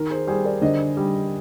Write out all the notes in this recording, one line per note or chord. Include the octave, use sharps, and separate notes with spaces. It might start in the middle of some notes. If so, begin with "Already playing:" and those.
Already playing: D#3 A#4
G#4 C5
G3 G#4 C5
A#4 D5
D3 C5 D#5
G3